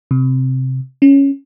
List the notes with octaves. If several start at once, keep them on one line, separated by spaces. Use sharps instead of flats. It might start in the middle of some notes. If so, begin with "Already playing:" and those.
C3
C#4